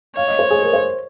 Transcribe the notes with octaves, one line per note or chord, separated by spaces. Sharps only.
C#5 F5
D#5
C5
G#4
A#4
C5